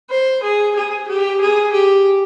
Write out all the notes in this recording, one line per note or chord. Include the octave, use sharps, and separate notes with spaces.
C5
G#4
G#4
G4
G#4
G4